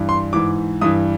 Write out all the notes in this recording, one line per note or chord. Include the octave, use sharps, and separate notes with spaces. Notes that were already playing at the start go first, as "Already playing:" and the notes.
Already playing: G2 E3
C6
G#2 E3 D6
G2 E3 D#6